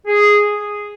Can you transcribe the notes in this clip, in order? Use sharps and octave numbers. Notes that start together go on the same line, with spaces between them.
G#4